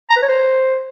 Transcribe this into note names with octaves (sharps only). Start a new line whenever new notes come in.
A#5
B4
C#5
C5